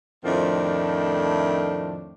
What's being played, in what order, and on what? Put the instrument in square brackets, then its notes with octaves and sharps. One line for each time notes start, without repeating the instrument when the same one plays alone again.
[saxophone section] F2 A2 D#3 F3 A3 D4